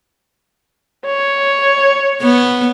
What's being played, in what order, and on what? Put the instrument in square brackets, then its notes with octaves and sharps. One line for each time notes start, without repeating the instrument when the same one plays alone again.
[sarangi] C#5
[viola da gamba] B3